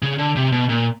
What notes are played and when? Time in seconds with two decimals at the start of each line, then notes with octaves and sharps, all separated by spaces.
0.02 C#3
0.18 D3
0.36 C3
0.52 B2
0.69 A#2